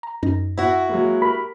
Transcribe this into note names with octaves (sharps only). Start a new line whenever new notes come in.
A#5
F#2 D#4 A#6
E4 F#4
F#3 G#3 A#3
G4 A#4 B5